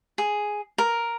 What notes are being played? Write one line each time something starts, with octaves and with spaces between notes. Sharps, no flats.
G#4
A#4